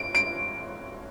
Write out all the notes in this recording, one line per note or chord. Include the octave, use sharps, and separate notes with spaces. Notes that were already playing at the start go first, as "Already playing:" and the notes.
Already playing: D7
D7